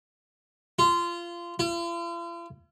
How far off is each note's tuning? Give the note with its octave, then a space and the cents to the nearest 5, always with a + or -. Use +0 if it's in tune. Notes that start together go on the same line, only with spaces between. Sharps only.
F4 -20
F4 -45